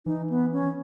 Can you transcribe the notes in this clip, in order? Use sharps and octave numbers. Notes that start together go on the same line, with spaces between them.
E3 D#4
B3
C#4